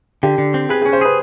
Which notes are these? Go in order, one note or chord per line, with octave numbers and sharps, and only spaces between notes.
D3 G4
D3
C4
G#4 B4
G#4
C#4
C5
G#4 B4